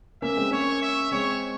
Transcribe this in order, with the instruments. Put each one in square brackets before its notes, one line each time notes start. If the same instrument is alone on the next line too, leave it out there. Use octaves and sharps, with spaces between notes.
[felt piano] A#3 C#4 [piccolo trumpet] E5
[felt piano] G#3 C4
[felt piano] A#3 C#4 [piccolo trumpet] C#5
[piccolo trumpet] E5
[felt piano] G#3 C4 [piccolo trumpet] C#5